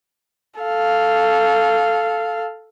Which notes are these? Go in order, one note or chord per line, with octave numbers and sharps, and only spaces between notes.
A4 F5